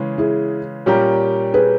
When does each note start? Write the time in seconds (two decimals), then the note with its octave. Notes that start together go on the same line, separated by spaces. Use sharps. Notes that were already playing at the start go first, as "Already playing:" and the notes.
Already playing: C#3 E3 G#3 C#4
0.18 E4 G#4
0.86 A#2 G3 C#4 G4 A#4
1.54 G#4 B4